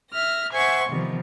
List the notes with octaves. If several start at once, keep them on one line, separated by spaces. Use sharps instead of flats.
E5 F6 A#6
C5 E5 F#5 G#5 C6 C#6
C3 D#3 F3 G3 B3